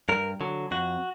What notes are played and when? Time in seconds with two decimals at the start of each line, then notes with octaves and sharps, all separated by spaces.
0.09 G2 A#4
0.41 D3 F#3
0.71 F2 F#4